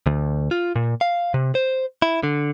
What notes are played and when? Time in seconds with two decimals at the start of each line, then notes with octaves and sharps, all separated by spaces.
0.06 D2
0.51 F4
0.76 A#2
1.01 F5
1.34 C3
1.55 C5
2.02 E4
2.23 D3